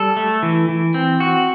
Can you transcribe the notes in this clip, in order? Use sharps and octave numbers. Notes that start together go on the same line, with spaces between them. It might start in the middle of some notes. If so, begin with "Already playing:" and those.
Already playing: G3 A4
A3
E3
E3
C4
F#4